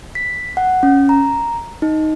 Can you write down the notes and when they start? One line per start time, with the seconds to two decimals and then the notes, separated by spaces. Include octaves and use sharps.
0.15 B6
0.57 F#5
0.83 C#4
1.09 A#5
1.82 D#4